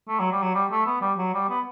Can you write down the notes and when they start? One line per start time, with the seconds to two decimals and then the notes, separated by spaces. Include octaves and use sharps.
0.08 A3
0.20 F#3
0.32 G3
0.43 F#3
0.54 G3
0.71 A3
0.87 B3
1.02 G3
1.18 F#3
1.34 G3
1.50 B3